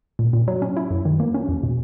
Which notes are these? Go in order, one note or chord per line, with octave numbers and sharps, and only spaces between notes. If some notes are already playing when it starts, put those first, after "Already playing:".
A#2
A#2
F#3
C#4
E4
F#2
D#3
A#3
C#4
E2
B2